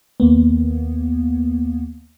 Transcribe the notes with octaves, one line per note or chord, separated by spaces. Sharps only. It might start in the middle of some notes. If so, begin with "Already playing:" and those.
D#2 A#3 B3